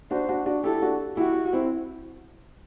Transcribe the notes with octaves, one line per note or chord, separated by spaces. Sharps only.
D4 F#4 C5
D4 F#4
D4 F#4
E4 G4 A4
D4 F#4
E4 F#4 G4
C4 E4